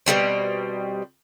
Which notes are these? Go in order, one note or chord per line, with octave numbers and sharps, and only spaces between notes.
B2 D3 G3 C4